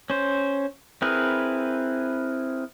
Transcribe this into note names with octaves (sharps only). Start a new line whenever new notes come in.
C#4 C5
C4 E4 G#4 A#4 B4